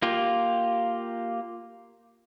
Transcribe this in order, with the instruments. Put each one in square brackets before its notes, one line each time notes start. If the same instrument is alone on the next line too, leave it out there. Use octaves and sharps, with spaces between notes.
[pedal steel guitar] A#3 F4 G4